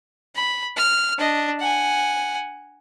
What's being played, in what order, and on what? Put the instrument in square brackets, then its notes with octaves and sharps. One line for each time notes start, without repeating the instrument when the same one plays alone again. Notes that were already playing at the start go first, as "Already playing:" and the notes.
[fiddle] B5
F6
D4 D#5
F#5 G#5